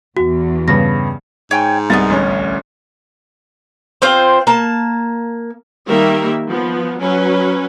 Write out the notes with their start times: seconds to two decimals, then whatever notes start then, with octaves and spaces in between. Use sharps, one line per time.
0.17 E2 F#4
0.68 G2 C#3 B3 A#6
1.51 G#2 C#5 G5 G#5
1.90 C2 B3 D#4 A#4 A6
2.10 A1 D2 C#4
4.02 C4 F4 C5
4.47 A#3 A5
5.89 D#3 G3 A#3 A#4 E5
6.49 F3 B3
7.01 F#3 C#4 B4